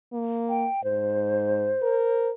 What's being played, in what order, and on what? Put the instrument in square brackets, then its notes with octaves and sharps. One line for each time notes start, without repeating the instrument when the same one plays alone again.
[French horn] A#3
[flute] G5
[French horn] G#2 [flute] C5
[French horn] A#4